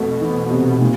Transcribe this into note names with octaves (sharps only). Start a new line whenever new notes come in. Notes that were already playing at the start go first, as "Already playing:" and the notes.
Already playing: F2 B2 A3
E3
C3
A#2